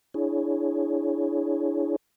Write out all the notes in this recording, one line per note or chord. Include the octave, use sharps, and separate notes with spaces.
D4 E4 G#4 C#5